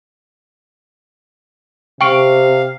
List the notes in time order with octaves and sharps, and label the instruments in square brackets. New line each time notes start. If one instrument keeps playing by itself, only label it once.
[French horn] C3 [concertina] F5 [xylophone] G5 C#6 D7